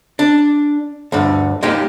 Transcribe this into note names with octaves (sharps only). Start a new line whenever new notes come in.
D4
D2 G2 D3
G#3 A#3 D#4 G4